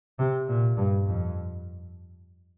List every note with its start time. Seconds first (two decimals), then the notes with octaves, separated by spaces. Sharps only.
0.19 C3
0.48 A#2
0.77 G2
1.06 F2